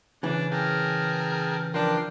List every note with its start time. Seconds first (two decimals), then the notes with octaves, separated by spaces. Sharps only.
0.23 C#3 E3 D4
0.52 G#4 A#4 G5 A5
1.74 F3 D4 A#4 G5 C6